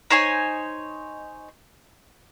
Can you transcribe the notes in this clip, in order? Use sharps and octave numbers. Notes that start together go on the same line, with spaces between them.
D#4 C5 C#5 G#5